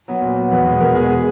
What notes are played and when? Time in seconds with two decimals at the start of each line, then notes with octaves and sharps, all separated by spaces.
0.08 F#3 B3
0.22 A#2
0.36 F#3 B3
0.52 E2 B4
0.66 B2 G#3 B3
0.80 E2 A#4
0.95 B2 G#3 B3 G#4
1.10 G#4